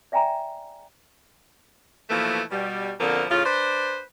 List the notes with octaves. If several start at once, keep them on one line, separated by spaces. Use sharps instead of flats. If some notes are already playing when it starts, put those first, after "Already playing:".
D5 E5 G5 G#5 A#5
B2 E3 F3 A3 A#3
B2 G3
B2 D3 F3 A#3 C4
A2 C#3 F4
D4 B4 C5